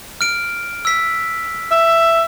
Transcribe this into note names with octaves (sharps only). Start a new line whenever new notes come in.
F6 D7
E6 B6
E5